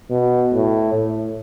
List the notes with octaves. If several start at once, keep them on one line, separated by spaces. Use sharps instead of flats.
B2
A2
A2